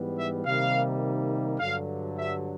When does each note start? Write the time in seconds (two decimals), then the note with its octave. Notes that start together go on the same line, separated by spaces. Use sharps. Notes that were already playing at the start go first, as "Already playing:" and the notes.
Already playing: G#2 E3 G3 B3
0.17 E5
0.45 C3 D#3 G3 A#3 D#4 F5
1.60 G2 D3 F#3 F5
2.17 E5